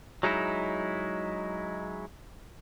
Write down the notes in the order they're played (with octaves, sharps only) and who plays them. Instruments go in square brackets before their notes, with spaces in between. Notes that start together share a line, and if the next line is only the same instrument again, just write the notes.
[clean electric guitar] F#3 G#3 D#4 E4